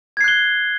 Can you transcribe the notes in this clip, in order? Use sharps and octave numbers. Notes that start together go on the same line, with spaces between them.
F#6 G#6 C7 G7